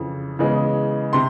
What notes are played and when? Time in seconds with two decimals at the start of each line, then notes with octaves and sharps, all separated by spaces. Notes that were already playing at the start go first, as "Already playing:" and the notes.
Already playing: F2 C#3 E3
0.39 C#3 E3 G#3 B3
1.13 C3 C6